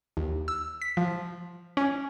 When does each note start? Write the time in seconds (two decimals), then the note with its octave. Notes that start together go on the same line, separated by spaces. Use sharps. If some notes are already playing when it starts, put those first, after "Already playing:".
0.17 D#2
0.48 E6
0.82 B6
0.97 F3
1.77 C#4